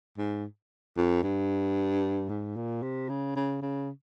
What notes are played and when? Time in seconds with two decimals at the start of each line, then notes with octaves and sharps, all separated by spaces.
0.17 G#2
0.97 F2
1.23 G2
2.29 G#2
2.56 A#2
2.82 C3
3.09 C#3
3.36 C#3
3.62 C#3